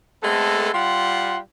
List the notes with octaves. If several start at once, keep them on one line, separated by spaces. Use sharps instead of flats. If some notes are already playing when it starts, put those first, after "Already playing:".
G#3 A3 B3 C4 A4
G3 F4 F#5 C6